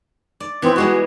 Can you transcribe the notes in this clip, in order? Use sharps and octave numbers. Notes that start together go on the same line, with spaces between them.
D5
E3 B3 C4
G3 G#3 B3 F#4